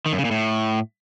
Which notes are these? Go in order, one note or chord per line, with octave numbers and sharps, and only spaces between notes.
D#3
F#2
C#3
A#2
A2